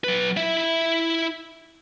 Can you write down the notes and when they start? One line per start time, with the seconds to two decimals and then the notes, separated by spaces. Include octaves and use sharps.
0.04 F#3 B4
0.37 E4 E5